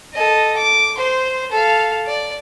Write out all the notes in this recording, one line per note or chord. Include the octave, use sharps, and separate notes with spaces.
A4 D#5
D6
C5 C6
A4 F5
D5